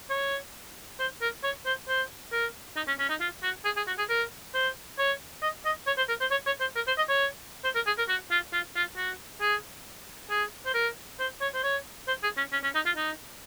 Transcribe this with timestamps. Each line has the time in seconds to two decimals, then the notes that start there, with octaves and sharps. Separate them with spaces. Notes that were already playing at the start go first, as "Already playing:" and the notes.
0.10 C#5
0.99 C5
1.21 A#4
1.43 C#5
1.66 C5
1.88 C5
2.32 A#4
2.76 D#4
2.87 C#4
2.99 C#4
3.09 D#4
3.20 F4
3.43 F#4
3.65 G#4
3.76 G#4
3.87 F#4
3.98 G#4
4.09 A#4
4.54 C5
4.98 C#5
5.42 D#5
5.65 D#5
5.87 C#5
5.97 C5
6.08 A#4
6.21 C5
6.31 C#5
6.46 C#5
6.60 C5
6.76 A#4
6.87 C5
6.97 D#5
7.09 C#5
7.64 C5
7.75 A#4
7.86 G#4
7.98 A#4
8.09 F#4
8.31 F4
8.53 F4
8.76 F4
8.97 F#4
9.41 G#4
10.30 G#4
10.66 C5
10.74 A#4
11.20 C5
11.41 C#5
11.54 C5
11.63 C#5
12.07 C5
12.23 G#4
12.37 C#4
12.52 C#4
12.63 C#4
12.75 D#4
12.86 F4
12.97 D#4